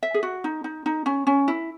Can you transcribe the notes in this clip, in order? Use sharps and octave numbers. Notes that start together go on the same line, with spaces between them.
E5
G#4
F#4
D#4
D#4
D#4
C#4
C#4
E4